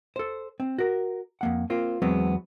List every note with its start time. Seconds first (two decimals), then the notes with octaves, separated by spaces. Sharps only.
0.16 A4 C5
0.60 C4
0.78 F#4 A#4
1.41 F2 A#3 F#5
1.70 A#3 C4 F4
2.02 E2 F#3 G#3 B3 C4